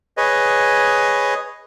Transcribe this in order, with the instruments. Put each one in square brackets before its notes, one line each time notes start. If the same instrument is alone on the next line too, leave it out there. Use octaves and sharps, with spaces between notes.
[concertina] G#4 B4 C#5 D#5